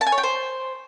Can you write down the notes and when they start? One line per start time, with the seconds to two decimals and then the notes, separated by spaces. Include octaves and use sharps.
0.01 A5
0.07 G#5
0.12 C#5
0.18 G5
0.23 C5